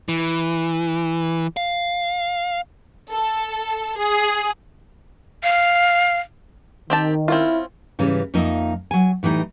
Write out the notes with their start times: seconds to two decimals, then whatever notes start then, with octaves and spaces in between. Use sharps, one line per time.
0.09 E3
1.57 F5
3.11 A4
3.98 G#4
5.43 F5
6.90 D#3 C4 G4 A5
7.28 C4 C#4 E4 F4
7.99 G#2 C#3 E3 G3 C#4
8.34 F2 F3 A#3 D#4 D#5 E5
8.91 F#3 G#5
9.23 A2 E3 G3 D#4